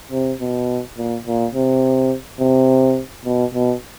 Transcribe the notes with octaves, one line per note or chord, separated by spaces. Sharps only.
C3
B2
A#2
A#2
C3
C3
B2
B2